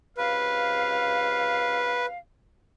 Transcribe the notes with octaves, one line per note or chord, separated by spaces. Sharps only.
C#2 C3 B4 F5